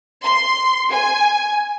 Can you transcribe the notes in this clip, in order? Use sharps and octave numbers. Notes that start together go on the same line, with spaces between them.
C6
G#5